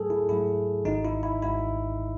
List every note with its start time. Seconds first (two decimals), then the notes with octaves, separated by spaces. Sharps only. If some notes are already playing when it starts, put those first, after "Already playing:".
Already playing: G#2 F#3 A3 G#4 A4
0.10 E4
0.29 G#2 F#3 A3 E4
0.85 G#1 G#2 D#3 D#4
1.05 E4
1.23 E4
1.42 G#1 G#2 D#3 E4